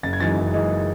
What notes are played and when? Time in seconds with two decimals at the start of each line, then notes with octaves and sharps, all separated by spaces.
0.03 F#1 A6
0.13 G#6
0.20 F#2 E3 G#3 D#4 A6
0.38 F#1
0.54 F#2 E3 G#3 D#4